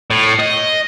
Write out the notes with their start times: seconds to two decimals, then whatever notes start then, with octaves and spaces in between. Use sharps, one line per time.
0.11 A2
0.39 D#5